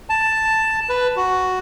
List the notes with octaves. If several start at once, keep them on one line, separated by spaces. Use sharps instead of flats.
A5
B4
F#4